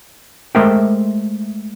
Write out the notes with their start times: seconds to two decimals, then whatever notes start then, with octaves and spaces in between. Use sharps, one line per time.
0.55 G#3 A3 A#4 C5 E5 G5